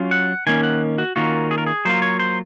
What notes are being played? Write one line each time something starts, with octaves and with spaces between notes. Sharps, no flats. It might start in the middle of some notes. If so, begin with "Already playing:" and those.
Already playing: F#3 C#4 F4
F#5
D#3 A#3 C#4 G#5
F#5
F#4
D#3 A#3 C#4 F4 F#4
G#4
A#4
G#4
F#3 A#3 F4 C5
C#5
C5